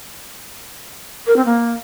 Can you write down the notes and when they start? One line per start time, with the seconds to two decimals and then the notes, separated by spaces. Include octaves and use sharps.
1.27 A#4
1.36 C4
1.46 A#3